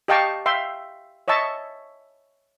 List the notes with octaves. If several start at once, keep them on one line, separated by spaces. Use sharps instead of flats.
G4 D#5 F5 G5 A5 C#6
E5 F5 G5 C6
C#5 D#5 E5 A5 C#6